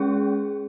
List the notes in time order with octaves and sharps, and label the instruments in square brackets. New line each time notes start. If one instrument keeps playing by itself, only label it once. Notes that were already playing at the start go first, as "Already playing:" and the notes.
Already playing: [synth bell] G#3 C#4 G#4